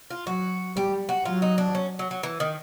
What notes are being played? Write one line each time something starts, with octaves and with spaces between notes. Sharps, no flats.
F4
F#3 F#4
G3 G4
F#4
F#3 F4
D#4
D4
C#4
F#3
F#3
E3
D#3